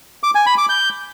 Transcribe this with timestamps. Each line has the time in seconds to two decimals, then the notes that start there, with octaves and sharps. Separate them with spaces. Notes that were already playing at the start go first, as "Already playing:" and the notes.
0.23 D6
0.35 G#5
0.46 B5
0.58 D6
0.69 G6